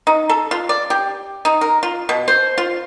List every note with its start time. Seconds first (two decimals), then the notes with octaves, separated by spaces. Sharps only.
0.07 D#4
0.30 A4
0.51 F4
0.69 D5
0.90 G4
1.45 D#4
1.61 A#4
1.83 F4
2.09 B2
2.28 C5
2.58 F4